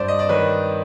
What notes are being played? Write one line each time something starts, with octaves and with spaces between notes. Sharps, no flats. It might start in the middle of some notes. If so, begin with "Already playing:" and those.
Already playing: G2 C5 D5
D#5
D5
D#3 B4 C#5